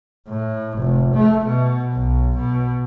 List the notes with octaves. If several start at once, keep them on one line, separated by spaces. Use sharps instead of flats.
A2
F1
A3
B2
B1
B2